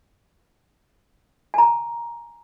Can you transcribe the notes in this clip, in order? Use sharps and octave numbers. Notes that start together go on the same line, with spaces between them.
G#5 A#5